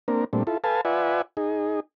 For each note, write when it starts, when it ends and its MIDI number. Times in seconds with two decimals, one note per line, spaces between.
0.08 0.24 58
0.08 0.24 60
0.08 0.24 62
0.08 0.24 70
0.33 0.43 46
0.33 0.43 55
0.33 0.43 57
0.33 0.43 60
0.33 0.43 62
0.47 0.58 64
0.47 0.58 65
0.47 0.58 69
0.64 0.81 69
0.64 0.81 71
0.64 0.81 77
0.64 0.81 80
0.64 0.81 81
0.85 1.22 65
0.85 1.22 71
0.85 1.22 74
0.85 1.22 76
0.85 1.22 78
0.85 1.22 80
1.37 1.80 63
1.37 1.80 68